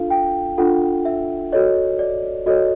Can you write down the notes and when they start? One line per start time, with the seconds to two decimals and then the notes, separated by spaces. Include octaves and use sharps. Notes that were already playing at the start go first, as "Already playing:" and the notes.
Already playing: D4 F4 A4 F5
0.10 G5
0.58 D4 F4 A4 F#5
1.05 E5
1.52 F#4 A4 C#5 D#5
1.99 D5
2.46 F#4 A4 C#5 D#5